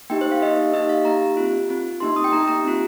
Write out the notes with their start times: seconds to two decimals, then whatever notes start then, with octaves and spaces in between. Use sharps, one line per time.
0.10 A#3 D#4 G4 G5
0.21 C5
0.32 F5
0.42 A#3 D#4 G4 D#5
0.73 A#3 D#4 G4 D#5
0.89 F5
1.05 A#3 D#4 G4 A#5
1.37 C4 F4
1.69 C4 F4
2.00 A#3 D#4 G4 C6
2.16 D#6
2.24 G5
2.32 A#3 D#4 G4 A#5
2.48 A#5
2.64 C4 F4